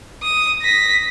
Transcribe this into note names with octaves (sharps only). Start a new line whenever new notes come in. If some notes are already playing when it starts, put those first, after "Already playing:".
D#6
A#6 B6